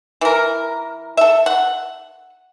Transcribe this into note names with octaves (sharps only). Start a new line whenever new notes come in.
E3 A#4
A4 E5
F#5